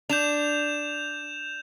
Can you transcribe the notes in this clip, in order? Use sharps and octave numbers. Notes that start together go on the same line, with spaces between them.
D4 G6 E7 F7